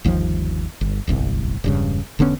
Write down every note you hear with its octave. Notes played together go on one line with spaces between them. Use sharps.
G1 D#2 C3 F3
G1
D1 G1 C2
E1 G2 C#3
E1 D3 B3 C#4